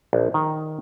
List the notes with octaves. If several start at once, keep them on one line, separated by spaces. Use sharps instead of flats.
A#1
D#3